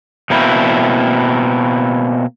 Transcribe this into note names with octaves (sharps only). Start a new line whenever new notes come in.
B2 A#3 C4 E4